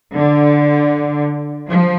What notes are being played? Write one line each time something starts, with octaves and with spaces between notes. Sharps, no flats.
D3
F3